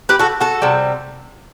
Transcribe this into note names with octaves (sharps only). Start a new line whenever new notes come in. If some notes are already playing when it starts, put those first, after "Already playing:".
G4 B4
F#4 A4
F#4 A4
C3 G3